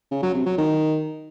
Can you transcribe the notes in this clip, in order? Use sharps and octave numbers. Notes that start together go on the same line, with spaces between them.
C#3
F#3
C3
F#3
D#3